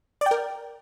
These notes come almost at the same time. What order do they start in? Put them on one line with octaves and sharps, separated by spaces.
D5 G5 A#4